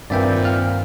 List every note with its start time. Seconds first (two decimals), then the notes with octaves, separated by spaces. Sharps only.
0.10 G2 A#2 D#3 C4 B4 D5 E5 G5
0.45 F5 F6